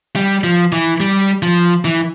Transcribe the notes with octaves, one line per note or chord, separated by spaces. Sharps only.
G3
F3
E3
G3
F3
E3